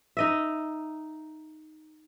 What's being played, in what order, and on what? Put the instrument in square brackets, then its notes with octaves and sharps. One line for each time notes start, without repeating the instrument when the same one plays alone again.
[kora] D#4 D#5 E5